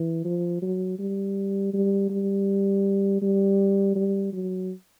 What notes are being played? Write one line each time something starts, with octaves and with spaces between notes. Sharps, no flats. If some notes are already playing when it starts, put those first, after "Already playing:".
Already playing: E3
F3
F#3
G3
G3
G3
G3
G3
F#3